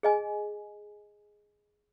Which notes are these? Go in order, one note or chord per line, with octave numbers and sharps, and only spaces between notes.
G#4 D#5 G#5